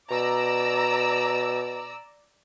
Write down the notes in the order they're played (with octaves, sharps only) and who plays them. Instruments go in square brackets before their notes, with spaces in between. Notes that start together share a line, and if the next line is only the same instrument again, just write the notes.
[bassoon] B2 [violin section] D5 A#5 E6